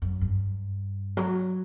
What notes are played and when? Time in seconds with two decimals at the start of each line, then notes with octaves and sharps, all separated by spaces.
0.02 F#2
0.21 G2
1.17 F#3